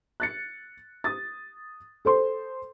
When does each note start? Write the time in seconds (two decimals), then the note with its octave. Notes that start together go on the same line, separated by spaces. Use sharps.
0.20 F#6 A6 C#7
1.04 D#6 A6
2.05 A4 C5 C6